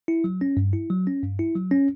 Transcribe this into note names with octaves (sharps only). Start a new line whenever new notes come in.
E4
F#3
C#4
G2
E4
F#3
C#4
G2
E4
F#3
C#4